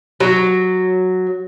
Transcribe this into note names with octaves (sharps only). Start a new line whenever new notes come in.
F#3